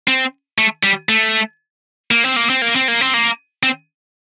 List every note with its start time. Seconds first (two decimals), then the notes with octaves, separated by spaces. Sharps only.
0.08 C4
0.58 A3
0.83 G3
1.09 A3
2.11 A#3
2.24 C4
2.36 A#3
2.50 C4
2.62 A#3
2.76 C4
2.88 A#3
3.01 C4
3.14 A#3
3.63 C4